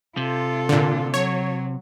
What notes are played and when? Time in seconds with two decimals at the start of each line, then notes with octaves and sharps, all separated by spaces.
0.17 C3 F4 A4
0.69 A#2 D3
1.14 F#3 C#5